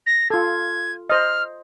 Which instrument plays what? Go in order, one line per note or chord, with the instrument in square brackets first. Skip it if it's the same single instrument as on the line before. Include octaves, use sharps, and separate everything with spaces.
[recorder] A#6
[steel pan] F4 A4 [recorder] G#6
[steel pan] C5 D#5 [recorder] F6